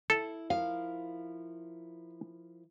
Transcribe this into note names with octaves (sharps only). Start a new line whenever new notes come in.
E4 A4
F3 E4 A#4 F5